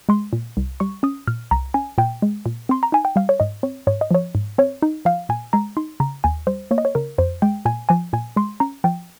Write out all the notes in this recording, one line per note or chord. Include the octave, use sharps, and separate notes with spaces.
G#3 C6
A#2
C2
G3 C#6
C#4 D#6
A#2 F6
C2 A#5
C#4 G#5
A#2 G5
G#3
A#2
C4 C6
A#5
D#4 G#5
G5
G3 F5
C#5
G#2 D#5
C4 C#5
G#2 C#5
D#5
F3 C#5
G#2
C4 C#5
D#4
F3 F5
A#2 G#5
G#3 A#5
D#4 C6
C#3 A#5
D#2 G#5
G3 C5
A#3 C#5
D#5
C#5
C#3 A#4
F2 C5
G#3 G5
A#2 G#5
F3 G#5
A#2 G#5
G#3 C6
C#4 A#5
F3 G5